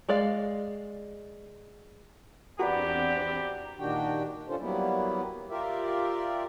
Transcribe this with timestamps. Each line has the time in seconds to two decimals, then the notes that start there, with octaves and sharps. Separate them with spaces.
0.09 G#3 D5 F5
2.59 E2 C4 D4 F#4 G4 A#4 B4 D5
3.79 A#2 D#3 D4 F#4 G4 G5
4.48 C#4 D4 F4 A4 C5
4.60 F#3 G3 A#3 B3 E4
5.50 F4 G4 A#4 D5 E5